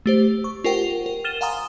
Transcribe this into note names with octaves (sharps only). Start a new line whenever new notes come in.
A3 G4 C5
C#6
F4 G4 A#4 C5 F#5 G5
A#4
F6 A6 D#7 E7 G7
F5 F#5 G#5 A#5 C6 D#6